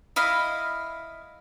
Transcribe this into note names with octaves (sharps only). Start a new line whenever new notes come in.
E4 D#5 F5 B5